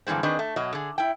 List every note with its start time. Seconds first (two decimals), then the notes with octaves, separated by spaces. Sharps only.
0.07 G2 D3 E3 G#3 C4
0.23 D#3 C4 D4 G#4 B4 D#5
0.39 A3
0.56 B2 F#3 D#5
0.73 D3 G#4
0.98 E4 G5